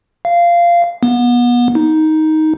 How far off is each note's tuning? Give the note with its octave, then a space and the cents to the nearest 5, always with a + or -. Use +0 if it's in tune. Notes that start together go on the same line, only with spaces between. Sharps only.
F5 -15
B3 -30
D#4 +10